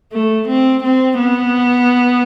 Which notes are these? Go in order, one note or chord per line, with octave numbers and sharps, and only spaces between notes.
A3
C4
C4
B3